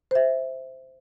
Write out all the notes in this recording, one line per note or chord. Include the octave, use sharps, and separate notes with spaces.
C5 E5